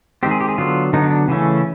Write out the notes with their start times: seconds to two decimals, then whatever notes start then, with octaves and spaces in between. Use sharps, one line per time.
0.23 D#3 G#3 C4 G4
0.31 G#4
0.41 G4
0.49 G#4
0.58 D3 F#3 B3 F4
0.93 D3 F#3 B3 D#4
1.11 D4
1.28 C#3 E3 A3 C#4